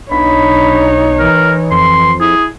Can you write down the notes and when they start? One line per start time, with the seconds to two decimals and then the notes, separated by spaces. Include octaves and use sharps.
0.11 B1 D4 D#4 C#5 B5
1.19 E3 A#4
1.71 F2 C6
2.21 E4 G#4